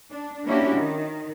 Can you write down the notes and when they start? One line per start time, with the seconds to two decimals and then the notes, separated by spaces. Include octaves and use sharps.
0.11 D4
0.45 A#3 C#4 D4 E4 F#4 G4
0.75 D#3